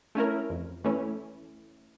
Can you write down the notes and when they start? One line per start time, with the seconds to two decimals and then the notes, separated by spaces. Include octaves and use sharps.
0.15 A3 C#4 E4 A#4
0.50 F2
0.84 E3 A3 C#4 E4